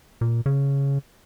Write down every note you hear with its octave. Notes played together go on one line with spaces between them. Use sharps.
A#2
C#3